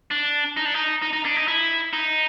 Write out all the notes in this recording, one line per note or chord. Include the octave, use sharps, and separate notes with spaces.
D4
D#4
D4
D#4
D#4
D#4
D4
D#4
E4
D#4